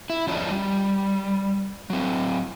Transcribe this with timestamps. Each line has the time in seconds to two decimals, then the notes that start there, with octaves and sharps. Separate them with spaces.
0.10 E4
0.27 E2 F3 C#4 D4 D#5
0.51 G3
1.90 F#3 C4